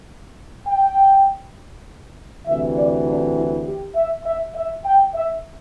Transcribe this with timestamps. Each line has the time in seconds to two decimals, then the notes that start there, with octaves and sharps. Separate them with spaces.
0.67 G5
2.46 D2 C3 E3 E5
2.76 D5
3.05 D4
3.35 E4
3.65 G4
3.95 E5
4.25 E5
4.55 E5
4.85 G5
5.14 E5